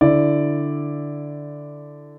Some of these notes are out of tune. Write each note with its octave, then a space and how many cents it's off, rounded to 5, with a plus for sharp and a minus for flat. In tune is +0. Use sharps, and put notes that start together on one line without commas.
D3 +0 E4 +0 D5 +0